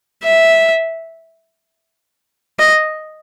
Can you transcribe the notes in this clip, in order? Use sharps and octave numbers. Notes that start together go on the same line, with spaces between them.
E5
D#5